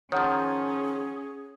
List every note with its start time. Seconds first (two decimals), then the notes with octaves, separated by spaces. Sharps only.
0.12 D#3 F3 C#4 G#4 C#5 F#5 A#5